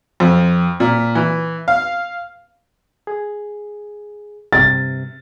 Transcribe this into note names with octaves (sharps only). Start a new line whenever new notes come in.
F2
A#2
E3
F5
G#4
G2 C3 A6